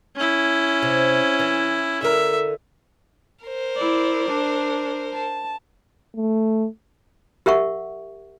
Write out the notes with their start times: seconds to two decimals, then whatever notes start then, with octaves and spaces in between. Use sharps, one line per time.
0.16 C#4 E4
0.82 C3
1.39 E3
2.02 D3 A#4 E5
3.45 A#4 C5
3.76 E4 D5
4.29 D4
5.14 A5
6.16 A3
7.46 G4 A#4 E5 F#5 C#6